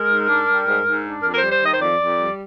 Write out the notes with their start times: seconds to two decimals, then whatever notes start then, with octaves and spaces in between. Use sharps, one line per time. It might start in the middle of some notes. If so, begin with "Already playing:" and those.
Already playing: G#3 A#4
0.08 G#2
0.28 D4
0.47 G3
0.66 G#2
0.86 G#2
1.04 D4
1.22 F2 A#4
1.33 A#4
1.37 C5
1.43 G3
1.52 C5
1.61 D#3 D#5
1.74 C5
1.80 F2 D5
2.00 F2
2.18 G3